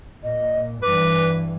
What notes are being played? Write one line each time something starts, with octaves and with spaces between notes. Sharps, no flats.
A#2 D#5
G2 E3 B4 D6